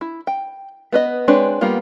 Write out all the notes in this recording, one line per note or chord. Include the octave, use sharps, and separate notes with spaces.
E4
G5
B3 B4 D#5
G#3 C4 D4 B4 C#5
G3 A#3 B3 F4